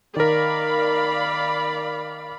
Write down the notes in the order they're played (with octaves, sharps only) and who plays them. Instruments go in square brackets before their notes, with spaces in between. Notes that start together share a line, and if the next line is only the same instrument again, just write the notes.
[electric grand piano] D#3 A#4 [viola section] D5 F5 B5